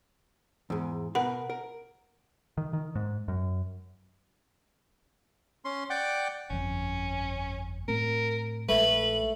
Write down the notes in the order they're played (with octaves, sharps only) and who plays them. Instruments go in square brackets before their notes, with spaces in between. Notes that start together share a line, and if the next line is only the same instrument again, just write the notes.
[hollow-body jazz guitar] E2 G#2
[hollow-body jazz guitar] B2 A#4 B4 [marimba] F#5
[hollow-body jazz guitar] A#4
[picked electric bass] D#3
D#3
G#2
F#2
[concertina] C#4 C6
D5 F#5 G5 D6
[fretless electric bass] G1 F2 [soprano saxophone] C#4
[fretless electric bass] A2 A3 C4 [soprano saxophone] A#4
[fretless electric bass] A#1 G#3 [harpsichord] A3 [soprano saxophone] B4 [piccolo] F#7